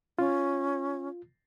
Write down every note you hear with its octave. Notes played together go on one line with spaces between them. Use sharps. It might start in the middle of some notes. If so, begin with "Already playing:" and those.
C#4 F4